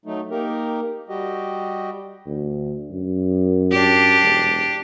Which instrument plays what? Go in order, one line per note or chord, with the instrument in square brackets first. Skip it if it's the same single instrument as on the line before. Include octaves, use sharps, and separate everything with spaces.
[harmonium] F#3 A3 D#4
A#3 D#4 G4 A#4
G3 F#4 G4 D#5
[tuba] D2
F#2
[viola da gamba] D4 G4
[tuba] E1